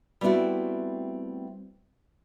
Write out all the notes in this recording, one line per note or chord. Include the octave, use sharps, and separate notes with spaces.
G3 A3 B3 C4 E4 F#4